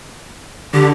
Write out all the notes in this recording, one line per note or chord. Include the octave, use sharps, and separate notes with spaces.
D3 G4